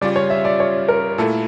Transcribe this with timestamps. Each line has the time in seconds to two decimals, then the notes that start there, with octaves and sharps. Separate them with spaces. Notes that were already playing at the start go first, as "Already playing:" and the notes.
0.01 C#3 G3 C#4 F4 D5
0.16 C#5
0.30 E5
0.45 D5
0.60 C#5
0.88 A#4
1.18 A#2 A3 E4 A4